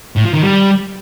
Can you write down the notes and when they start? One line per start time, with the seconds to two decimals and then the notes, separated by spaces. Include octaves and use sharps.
0.17 A2
0.26 F3
0.34 D#3
0.43 G3